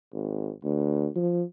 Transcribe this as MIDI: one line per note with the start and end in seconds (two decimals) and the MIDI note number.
0.13 0.50 32
0.64 1.07 38
1.15 1.43 53